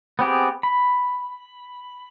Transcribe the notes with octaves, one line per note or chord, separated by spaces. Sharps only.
B3 C4 G4 G#4
B5